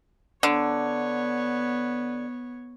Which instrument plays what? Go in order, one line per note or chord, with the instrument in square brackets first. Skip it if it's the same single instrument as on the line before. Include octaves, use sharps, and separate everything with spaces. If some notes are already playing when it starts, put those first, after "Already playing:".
[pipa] D3 [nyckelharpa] B3 C#5